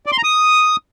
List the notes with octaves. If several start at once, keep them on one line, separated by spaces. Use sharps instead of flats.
D5
C6
A#5
D#6